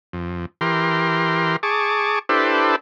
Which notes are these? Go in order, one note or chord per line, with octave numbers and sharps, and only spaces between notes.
F2
E3 G4 A#4 C6
G#4 A5 C#6 D6
D4 E4 G4 A4 B4 C5